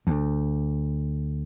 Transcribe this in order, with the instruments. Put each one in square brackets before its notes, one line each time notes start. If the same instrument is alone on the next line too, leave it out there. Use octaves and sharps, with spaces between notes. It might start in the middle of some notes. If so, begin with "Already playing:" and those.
[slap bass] D2